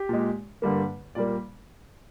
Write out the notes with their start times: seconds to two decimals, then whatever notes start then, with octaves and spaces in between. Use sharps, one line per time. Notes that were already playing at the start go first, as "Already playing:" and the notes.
Already playing: G4
0.09 A#2 G#3
0.62 G2 D3 G3 A#3
1.15 A#2 G3 A#3 D5